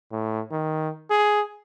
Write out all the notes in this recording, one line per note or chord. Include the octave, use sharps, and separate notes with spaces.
A2
D#3
G#4